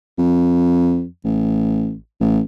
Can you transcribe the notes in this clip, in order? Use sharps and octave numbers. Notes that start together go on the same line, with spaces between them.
F2
A1
A1